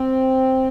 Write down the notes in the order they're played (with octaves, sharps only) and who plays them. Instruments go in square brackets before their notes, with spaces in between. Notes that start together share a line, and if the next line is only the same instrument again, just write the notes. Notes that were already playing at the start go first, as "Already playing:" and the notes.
Already playing: [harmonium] C4